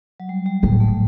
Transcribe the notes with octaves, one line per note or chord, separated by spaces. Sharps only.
F#3
G3
G3
A2 G3
A3